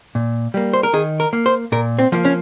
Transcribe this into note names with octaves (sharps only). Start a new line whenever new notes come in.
A#2
G3 A#3
C5
A#4
D#3 G#4
A#4
A#3
C5
A#2 A#4
C4
F3 A#3
C#4